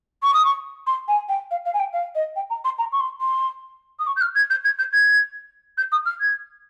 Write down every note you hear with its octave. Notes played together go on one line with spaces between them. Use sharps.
C#6
D#6
C#6
C6
G#5
G5
F5
F5
G#5
G5
F5
D#5
G5
A#5
C6
A#5
C#6
C6
C6
D#6
C#6
G6
F6
G#6
G6
G#6
G6
G#6
G6
D#6
F6
G#6